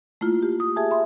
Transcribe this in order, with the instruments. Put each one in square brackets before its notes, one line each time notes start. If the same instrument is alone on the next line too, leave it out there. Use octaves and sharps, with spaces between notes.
[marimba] A3 A#3 E4 F4
G4
D#6
G4 G#4 E5 G#5 A5
E5 B5 C6